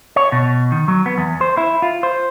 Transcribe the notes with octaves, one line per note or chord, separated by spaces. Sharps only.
C#5
B2
D#3
F#3
B3
E2
C5
E4
F4
C5